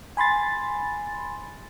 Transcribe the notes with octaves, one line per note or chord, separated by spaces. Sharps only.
G#5 B5 C6 A6